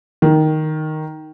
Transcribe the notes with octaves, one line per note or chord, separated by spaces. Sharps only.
D#3